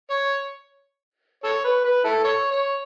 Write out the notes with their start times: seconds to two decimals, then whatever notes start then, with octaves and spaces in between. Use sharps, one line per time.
0.10 C#5
1.44 A4 C#5
1.64 B4
1.84 B4
2.05 E4 A4
2.24 A4 C#5
2.51 C#5